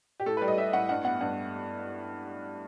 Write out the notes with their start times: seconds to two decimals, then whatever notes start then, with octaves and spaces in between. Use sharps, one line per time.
0.20 G4
0.26 A2 A4
0.37 B4
0.42 G3
0.48 D#5
0.58 G3 E5
0.73 A2 F#5
0.89 G2 F#5
1.04 B3 F#5
1.21 G2 F#5